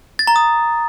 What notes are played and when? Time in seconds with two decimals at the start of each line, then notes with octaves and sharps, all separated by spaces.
0.19 A6
0.27 A#5
0.36 D#6